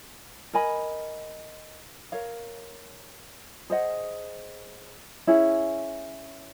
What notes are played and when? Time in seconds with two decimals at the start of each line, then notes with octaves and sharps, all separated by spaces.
0.53 A#4 D#5 G#5 B5
2.12 A#4 C#5 F5
3.70 G#4 C5 D#5 F#5
5.27 C#4 E4 G#4